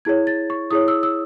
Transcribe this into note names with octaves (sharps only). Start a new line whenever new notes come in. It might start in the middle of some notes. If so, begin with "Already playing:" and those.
E4 G#4 C#5 G#6
A6
C#6
E4 G#4 C#5 D#6
E6
E6